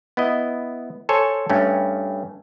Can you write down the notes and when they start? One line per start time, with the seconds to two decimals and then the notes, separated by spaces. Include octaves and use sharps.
0.17 B3 E4 D#5
1.09 A4 C5 C#5 G#5
1.50 G2 A3 C#4